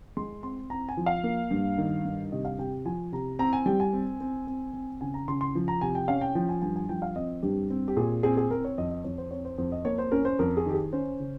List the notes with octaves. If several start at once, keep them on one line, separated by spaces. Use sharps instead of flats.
G#3 C6
C4 C6
C4 A#5
G#5
F3
F5
A#3
G2
D#3
G2
C3 D#5
F5
C3 G5
F3 G#5
C3 A#5
C4 A#5
G#5
G3 G5
G#5
C4
C4
C4
C4
C#3 G#5
A#5
C#3 C6
C6
F3
A#5
C3 G#5
G5
C#4 F5
G5
F3 G5
G#5
G2 G#5
G#5
F3 G5
F5
C4 D#5
G2 G4
C4
G4
A#2 G#4
C4 G#4
G#4
C4 A#4
C#5
F2 D#5
D#5
F2 C#5
C5
C4 C#5
C5
F2 C5
D#5
A#3 C#5
C5
C#4 A#4
C5
F2 A#4
G#4
D#3 G4
G#4
C#4 C5
C#3